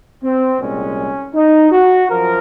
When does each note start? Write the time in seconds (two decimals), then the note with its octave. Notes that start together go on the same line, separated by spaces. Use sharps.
0.24 C4
0.61 C2 A#2 G#3 C#4
1.35 D#4
1.72 F#4
2.08 F#2 F3 A#4